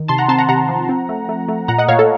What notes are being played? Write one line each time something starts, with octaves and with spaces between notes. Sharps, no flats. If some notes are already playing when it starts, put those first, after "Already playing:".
Already playing: D#3
C3 A5 C6
F#5 A#5
C4 A5 C6
F#5 A#5
C3 F#5 A#5
F3
C4
A3
A3
A3
A#2 F#5 A#5
D#5 F#5
A#2 C#5 F5
A4